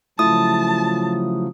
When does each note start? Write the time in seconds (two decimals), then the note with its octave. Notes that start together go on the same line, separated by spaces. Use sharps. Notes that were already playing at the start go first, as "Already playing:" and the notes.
0.19 C#3 F3 F#3 A3 E4 F4 A5 D#6